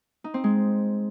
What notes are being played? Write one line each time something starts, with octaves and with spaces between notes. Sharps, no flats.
D#4
C4
G#3